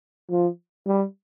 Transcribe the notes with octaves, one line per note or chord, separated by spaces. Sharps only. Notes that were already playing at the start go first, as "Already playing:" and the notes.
F3
G3